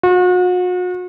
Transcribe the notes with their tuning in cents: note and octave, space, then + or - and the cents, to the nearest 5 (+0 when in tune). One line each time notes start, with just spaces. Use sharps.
F#4 -40